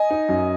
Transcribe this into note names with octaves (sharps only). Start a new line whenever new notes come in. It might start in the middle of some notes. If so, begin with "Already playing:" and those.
Already playing: D#5 G#5
D#4
F#2